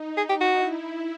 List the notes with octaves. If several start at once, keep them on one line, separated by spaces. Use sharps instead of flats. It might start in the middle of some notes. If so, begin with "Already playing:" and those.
Already playing: D#4
G#4
G4
F#4
E4